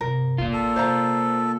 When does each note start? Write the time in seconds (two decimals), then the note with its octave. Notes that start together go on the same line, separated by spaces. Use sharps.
0.01 G2 C3 A#4
0.38 E1 C#2 A#3 F4
0.53 A1 A4
0.76 C3 C5 F5 A#5